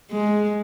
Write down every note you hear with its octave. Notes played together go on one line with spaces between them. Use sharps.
G#3